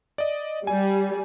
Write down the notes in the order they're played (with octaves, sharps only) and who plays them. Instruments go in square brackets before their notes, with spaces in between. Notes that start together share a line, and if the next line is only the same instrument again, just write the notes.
[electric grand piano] D5 D#5
[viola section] G3 [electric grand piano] G#5